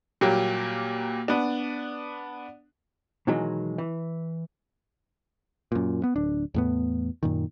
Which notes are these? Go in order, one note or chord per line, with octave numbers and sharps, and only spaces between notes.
A#2 F#3 G3 A#3 G4
B3 D4
B2 D#3 E3 F#3 G#3
E3
F#2 A#2
B3
D1 D4
E2 A2 B3
F#2 A#2 D#3